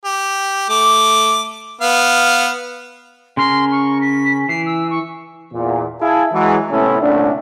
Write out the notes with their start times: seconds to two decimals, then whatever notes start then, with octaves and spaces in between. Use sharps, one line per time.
0.05 G4
0.69 A3 D6
1.81 B3 F5
3.37 C#3 C#4 A#4 C6
3.71 C#6
4.01 B6
4.49 E3 C7
4.66 E6
4.91 C#6
5.54 E2 A#2
6.01 E4 G#4 F5 G#5 A5
6.33 E3 F#3 G#3
6.71 A2 C3 A3 B3 C#4 E4
7.01 C2 A#2 D3 A3 C#4 D4